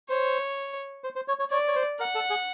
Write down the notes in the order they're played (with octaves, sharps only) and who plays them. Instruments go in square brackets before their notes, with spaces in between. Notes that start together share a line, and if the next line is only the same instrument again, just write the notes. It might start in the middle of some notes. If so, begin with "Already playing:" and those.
[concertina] C5 [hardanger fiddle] C#5
[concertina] C5
C5
C#5
C#5
[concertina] C#5 [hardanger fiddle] D5
[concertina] C#5
C5
[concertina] A#4 [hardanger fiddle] F#5
[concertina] A4
G#4